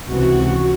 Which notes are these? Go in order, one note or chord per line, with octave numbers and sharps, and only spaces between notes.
C#2 C3 E3 F#4